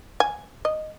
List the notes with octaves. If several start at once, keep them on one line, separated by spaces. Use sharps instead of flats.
G#5
D#5